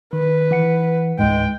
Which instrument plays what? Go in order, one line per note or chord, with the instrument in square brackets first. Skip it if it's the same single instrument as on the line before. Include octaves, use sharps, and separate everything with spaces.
[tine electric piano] D#3 [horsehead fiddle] B4
[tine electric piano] E3 F#5 C#7
[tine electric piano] C#2 G#2 [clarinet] G#3 [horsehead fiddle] G5